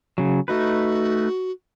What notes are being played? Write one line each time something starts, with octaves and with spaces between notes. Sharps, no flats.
C#3 F#3
A3 D#4 F#4 B4